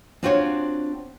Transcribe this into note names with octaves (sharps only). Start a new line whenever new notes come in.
C4 D4 F4 F#4 C5 C#5